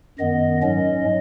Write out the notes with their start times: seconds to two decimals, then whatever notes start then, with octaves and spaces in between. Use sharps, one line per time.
0.19 F#2 D#3 B3 D#5
0.62 G#2 F#3 C#4 D#5